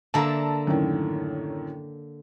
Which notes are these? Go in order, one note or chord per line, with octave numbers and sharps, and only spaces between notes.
D3 A#3 E5 A5 A#5
F#2 A2 D#3